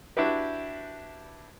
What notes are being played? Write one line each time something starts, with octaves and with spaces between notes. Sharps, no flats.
D4 E4 F#4 G4 B4